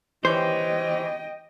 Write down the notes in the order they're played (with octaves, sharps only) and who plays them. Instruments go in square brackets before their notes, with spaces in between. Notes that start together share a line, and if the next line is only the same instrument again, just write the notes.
[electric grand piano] E3 G4 C#5 [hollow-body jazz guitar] C5 [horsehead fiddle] D#5 G5